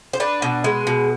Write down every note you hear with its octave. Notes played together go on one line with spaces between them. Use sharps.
C5
D4 B4
B2
G#3
B2